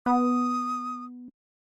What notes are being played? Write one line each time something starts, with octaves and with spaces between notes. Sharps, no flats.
B3 D#6